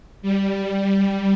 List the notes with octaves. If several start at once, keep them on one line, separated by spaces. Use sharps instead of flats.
G3